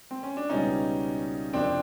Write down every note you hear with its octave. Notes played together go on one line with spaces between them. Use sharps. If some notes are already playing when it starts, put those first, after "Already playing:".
C4
C#4
D4
C#2 B2 G3 C#4 D#4
F#1 F2 C3 C4 D4